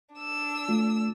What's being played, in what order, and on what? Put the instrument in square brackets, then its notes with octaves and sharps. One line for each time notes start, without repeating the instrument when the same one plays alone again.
[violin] D4 E6
[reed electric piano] A3 F4